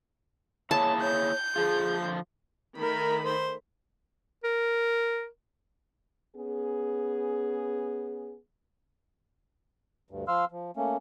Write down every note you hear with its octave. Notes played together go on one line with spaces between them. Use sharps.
A#3 E4 G#4 C#5 A5
C#5 G6
D3 F3 F4 G#4
D#3 A3 A#4 B5
C5
A#4
B3 C#4 G#4
D2 G2
F3 F5 C6 E6 F6
F3
A3 A#3 C#4